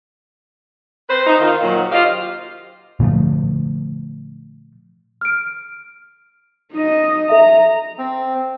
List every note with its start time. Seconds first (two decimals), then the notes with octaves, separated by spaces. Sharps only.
1.09 C4 B4 C5
1.26 D#4
1.40 D#3 F4
1.63 A#2 D#3 F#3
1.92 F4 G4 C5 D#5 F5
3.00 A#2 D3 F3 A3
5.21 F6 D7
6.73 D#4 D#5
7.29 A4 E5 A#5
7.98 C4